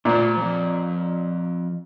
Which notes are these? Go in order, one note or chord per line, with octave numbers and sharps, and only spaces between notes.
A#2 A3 C5
F3 C4